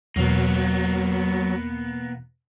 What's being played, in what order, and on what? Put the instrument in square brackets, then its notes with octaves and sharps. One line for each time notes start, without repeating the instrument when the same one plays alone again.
[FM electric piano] E2 B2 [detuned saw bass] F#3 [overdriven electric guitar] A#3 B3